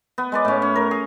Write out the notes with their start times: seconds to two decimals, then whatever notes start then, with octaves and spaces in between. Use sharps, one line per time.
0.18 B3
0.32 G#3 B4 D5
0.45 A2 C#4
0.62 C#4
0.76 A#4
0.91 G#4